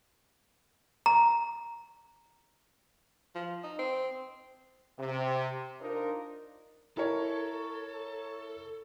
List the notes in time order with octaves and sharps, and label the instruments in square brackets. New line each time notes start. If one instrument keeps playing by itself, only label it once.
[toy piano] A#5
[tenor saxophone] F3
D#4
C4
[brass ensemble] C3
D4 D#4 F4 A#4 C5
[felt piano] E4 A#4 C#5 [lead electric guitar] A4